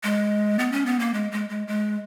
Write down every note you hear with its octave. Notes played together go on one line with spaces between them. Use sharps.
G#3
B3
C#4
B3
A#3
G#3
G#3
G#3
G#3